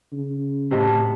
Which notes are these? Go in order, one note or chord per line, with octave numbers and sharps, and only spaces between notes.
C#3
A2 C3 C#5 D#5 A5